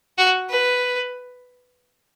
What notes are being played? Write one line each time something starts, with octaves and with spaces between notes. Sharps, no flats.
F#4
B4